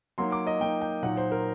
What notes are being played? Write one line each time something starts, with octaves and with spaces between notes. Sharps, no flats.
F#3 A#3 D#4 C6
D6
D#5
F#3 A#3 D#4 G5
G5
A#2 F#3 A#3 D#4 F#5
C5
A#4